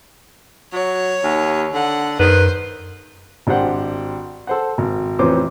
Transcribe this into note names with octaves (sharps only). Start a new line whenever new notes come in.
F#3 C#5
D#2
D3 F#5
F#2 D#3 B4 C5
G#1 D4 G4 C5 F#5 G5
A4 C5 F#5
G#1
A1 F2 E3 C5 C#5 D6